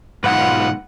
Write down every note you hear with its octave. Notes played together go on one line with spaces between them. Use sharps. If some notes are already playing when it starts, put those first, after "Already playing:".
B1 G#2 F4 B4 F#5